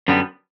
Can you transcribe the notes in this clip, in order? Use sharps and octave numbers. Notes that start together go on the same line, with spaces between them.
F#2 D3 G3 B3